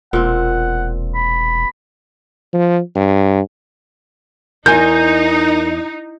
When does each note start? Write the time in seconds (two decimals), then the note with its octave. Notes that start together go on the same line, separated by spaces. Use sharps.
0.13 E1 A#2 C4 F#5
1.15 B5
2.54 F3
2.95 G2
4.66 E2 D#4 A#4 G#5 G6